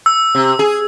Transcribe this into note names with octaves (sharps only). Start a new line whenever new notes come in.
E6
C3
G#4